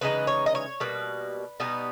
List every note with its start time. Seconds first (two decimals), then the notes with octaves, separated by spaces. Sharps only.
0.01 C#3 E3 G#3 D#4 B4
0.27 C#5
0.46 D#5
0.55 C#5
0.80 B2 G3 A#3 B4
1.60 B2 G3 B3 D#4